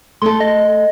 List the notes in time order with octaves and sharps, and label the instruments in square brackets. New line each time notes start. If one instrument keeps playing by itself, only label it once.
[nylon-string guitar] A3 A4 [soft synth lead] C6
[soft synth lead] D#5